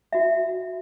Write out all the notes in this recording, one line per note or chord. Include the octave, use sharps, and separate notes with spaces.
F#4 E5